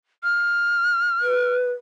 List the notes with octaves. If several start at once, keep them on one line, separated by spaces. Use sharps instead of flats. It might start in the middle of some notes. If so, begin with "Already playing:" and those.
F6
B4